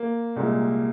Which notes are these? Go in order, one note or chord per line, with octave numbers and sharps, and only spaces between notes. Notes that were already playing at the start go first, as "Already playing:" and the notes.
Already playing: A#3
C2 A#2 G#3